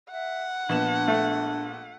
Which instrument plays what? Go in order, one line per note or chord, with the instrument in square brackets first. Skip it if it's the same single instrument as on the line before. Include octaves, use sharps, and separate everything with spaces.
[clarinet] E5 [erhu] F#5
[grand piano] A#1 B3 E7 [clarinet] D4
[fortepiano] A3